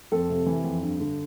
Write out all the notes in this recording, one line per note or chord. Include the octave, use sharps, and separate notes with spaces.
F2 A4
C3
E3
F2
G2
D3